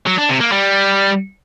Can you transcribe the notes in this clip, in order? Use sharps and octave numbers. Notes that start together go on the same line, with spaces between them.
F#3
D4
C3
A#3
G3